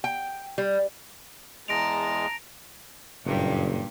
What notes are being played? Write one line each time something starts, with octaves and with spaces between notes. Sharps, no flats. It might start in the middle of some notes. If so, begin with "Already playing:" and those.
G5
G3
E2 G#3 A5 A#5 A#6 D7 F7
F#1 G2 A#2 G3